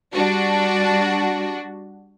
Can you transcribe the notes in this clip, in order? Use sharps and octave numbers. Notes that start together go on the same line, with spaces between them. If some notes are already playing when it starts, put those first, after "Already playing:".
G3 D4 F#4